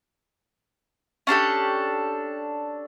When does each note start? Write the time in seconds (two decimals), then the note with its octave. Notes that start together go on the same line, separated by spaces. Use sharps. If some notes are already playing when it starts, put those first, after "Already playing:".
1.27 C#4 D4 G4 A4